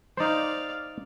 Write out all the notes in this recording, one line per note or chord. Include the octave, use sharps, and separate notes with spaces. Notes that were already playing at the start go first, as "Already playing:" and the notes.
D#4 C5 D5 F5